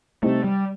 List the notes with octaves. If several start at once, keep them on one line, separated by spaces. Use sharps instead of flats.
C3 G3 A3 C4 D#4
G3